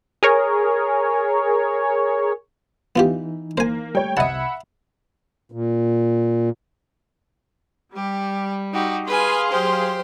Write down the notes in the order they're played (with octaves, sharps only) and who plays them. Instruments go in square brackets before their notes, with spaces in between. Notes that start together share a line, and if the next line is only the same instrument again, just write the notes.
[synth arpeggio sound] G#4 A#4 C#5
[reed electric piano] E3 D#4 [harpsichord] B3 F4 G4
[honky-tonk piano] A#3 [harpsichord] C5 G#5
[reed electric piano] G3 A3 [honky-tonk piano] C#5 G5
[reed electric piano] C2 C3 G#6 [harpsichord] D#5 A5 [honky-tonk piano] E5 F#5 B5
[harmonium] A#2
[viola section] G3 [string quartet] G4
[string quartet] D#4 F#4 G4
[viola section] G#4 F5 C6 [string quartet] B4 G#5
[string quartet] F#3 G4 C5